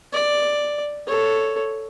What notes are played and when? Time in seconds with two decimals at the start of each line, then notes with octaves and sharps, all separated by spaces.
0.13 D5
1.07 A4 C#5